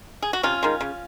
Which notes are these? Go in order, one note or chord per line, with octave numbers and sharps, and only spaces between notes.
G#4
F#4
C3 C#4 F4
D#3 G#3
C#3